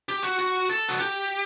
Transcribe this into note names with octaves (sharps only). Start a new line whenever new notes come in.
G4
F#4
F#4
A4
F#4
G4